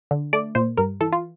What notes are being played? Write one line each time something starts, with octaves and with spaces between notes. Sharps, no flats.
D3
A3 D5
A#2 C5
G2 A#4
E3 A4
F4